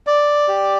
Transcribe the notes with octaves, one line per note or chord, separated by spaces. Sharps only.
D5
G4